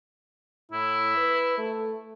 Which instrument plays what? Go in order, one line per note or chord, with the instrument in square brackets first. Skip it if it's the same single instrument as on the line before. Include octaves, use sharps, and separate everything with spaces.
[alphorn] A2 [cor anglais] E4
[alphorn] B4
A3